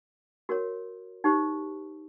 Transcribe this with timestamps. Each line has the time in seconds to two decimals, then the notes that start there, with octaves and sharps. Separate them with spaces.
0.49 F#4 A#4 C#5
1.24 D#4 G4 C5